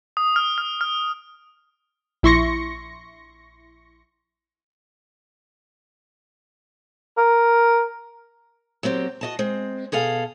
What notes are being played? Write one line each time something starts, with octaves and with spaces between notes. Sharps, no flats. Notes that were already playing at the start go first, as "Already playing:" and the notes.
D#6
F6
F6
F6
A#1 E4 C6 C#6 A#6 C#7
A#4
F#3 A#3 C4 G4
F#4 D#5 A5
G#3 C4
B2 G#4 A4 F5